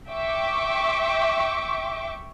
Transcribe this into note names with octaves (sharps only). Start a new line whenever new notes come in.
E5 G5 C#6 D6